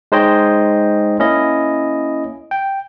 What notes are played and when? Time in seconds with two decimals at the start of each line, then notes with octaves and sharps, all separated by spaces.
0.12 G#3 D#4 C5 C#5 D#5 G5
1.19 A#3 C#4 E4 D#5
2.51 G5